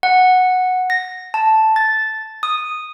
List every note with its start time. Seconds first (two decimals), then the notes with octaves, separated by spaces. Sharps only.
0.03 F#5
0.90 A#6
1.34 A5
1.76 A6
2.43 D#6